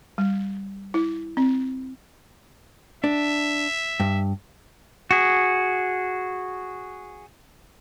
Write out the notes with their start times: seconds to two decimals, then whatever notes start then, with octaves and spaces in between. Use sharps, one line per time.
0.18 G3
0.94 E4
1.37 C4
3.04 D4 E5
4.00 G2
5.11 F#4 G#4